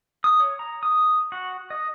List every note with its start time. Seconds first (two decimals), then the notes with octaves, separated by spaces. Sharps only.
0.24 D#6
0.40 C#5
0.59 A#5
0.83 D#6
1.32 F#4
1.70 D#5